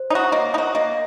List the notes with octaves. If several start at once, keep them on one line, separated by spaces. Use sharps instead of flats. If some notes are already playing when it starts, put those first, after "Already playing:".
Already playing: C5
D#4 F#4 C#5
A#3 D#5
D#4
F#4
A#3 D#5